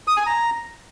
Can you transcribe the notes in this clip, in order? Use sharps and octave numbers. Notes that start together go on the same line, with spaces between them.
D#6
G#5
A#5